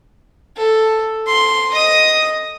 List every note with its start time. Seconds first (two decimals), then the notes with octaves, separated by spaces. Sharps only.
0.57 A4
1.27 C6
1.71 D#5 D#6